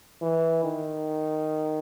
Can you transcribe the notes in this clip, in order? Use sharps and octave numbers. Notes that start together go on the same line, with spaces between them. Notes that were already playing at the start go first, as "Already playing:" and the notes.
E3
D#3